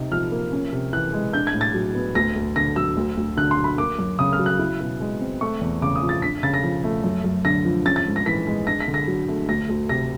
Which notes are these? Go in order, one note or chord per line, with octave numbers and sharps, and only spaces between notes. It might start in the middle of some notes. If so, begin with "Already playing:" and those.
Already playing: C3 D#4
F3 F6
A#3
C#4
C3
E3 F#6
G#3
D4 G6
G#6
A2
A6
F#3
B3
D2 A#6
D2
D3 A#6
F#3 E6
D2
D2
D3 F#6
C6
F#3
B5
A#3 D6
F#2
C#3 D#6
F6
F#3
F#6
E4
B2
G#3
C4
A3 C#6
E2
C#3 D6
D#6
F3
A6
D4 B6
C#3 A6
A#6
F3
A3
F#2
F#2
D3 A#6
F3
C#4 A6
A6
G#2
A#6
E3 B6
G#3
D4 A#6
B6
D3
A#6
F#3
A3
D2 A#6
D2
C3 A#6